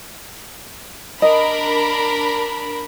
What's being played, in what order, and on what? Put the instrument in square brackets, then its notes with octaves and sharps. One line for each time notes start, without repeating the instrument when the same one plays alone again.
[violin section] D4 A#4 B5 [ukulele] D#5